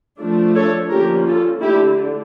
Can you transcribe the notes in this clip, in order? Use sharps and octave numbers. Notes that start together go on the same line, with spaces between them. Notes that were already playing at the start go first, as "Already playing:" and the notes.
F3 A3 D4
A4 C#5
D3 F3 A#3 C#4 G4 A#4
F4 A4
D3 A3 D4 E4 G4